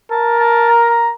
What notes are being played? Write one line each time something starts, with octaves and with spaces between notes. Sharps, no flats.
A#4 A5
A5
A#5
A#5